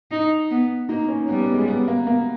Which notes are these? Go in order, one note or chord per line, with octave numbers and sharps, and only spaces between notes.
D#4
B3
A#3 D#4
C#4
G3 B3
B3
G#3
B3
A#3
A#3